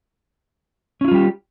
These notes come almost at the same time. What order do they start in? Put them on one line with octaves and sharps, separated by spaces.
C#4 E4 F4 G3 G4